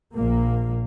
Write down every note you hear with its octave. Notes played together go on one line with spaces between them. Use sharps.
A#1 A#2 A#3